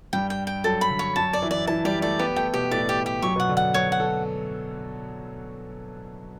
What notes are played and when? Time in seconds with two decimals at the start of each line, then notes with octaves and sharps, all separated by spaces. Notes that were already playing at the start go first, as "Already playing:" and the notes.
0.13 G2 G3 G5
0.30 G5
0.47 G5
0.64 F#2 F#3 A4
0.81 B5
0.90 D3
0.99 C#5
1.16 F#2 F#3 A5
1.33 D5
1.42 E3 E4
1.51 D5
1.67 E3 E4 A5
1.85 G3 G4 D5
2.02 A3 A4 D5
2.19 B3 G4 B4
2.36 A3 A4 G5
2.54 B2 B3 G4
2.71 A2 A3 D5
2.89 G4
3.06 G4
3.22 F#2 F#3 C#6
3.36 B2 B3 F#5
3.48 D3 D4
3.57 F#5
3.74 F#3 F#4 C#5
3.92 F#5
4.00 A4